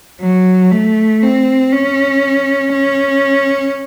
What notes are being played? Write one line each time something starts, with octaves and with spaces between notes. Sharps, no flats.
F#3
A3
C4
C#4
C#4